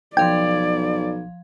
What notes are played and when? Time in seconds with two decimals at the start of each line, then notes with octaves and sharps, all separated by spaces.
0.17 B1 F3 D5 F5 G5 G#6